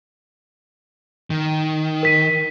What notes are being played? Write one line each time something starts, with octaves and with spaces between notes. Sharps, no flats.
D#3
A#4 B6 D#7